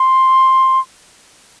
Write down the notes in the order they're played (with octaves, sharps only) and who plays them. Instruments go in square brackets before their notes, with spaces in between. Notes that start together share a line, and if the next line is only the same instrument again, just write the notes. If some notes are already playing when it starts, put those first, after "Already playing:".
Already playing: [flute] C6